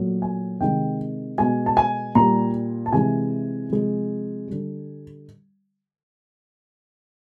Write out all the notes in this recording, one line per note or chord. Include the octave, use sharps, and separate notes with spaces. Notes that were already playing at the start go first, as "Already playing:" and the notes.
Already playing: A#2 F#3 A3
G#5
C3 D#3 G#3 G5
B2 G#3 G#5
A5
G#5
A#2 G3 A#5
A5
C3 E3 G#3 G#5
C3 F3 G#3
D3 G3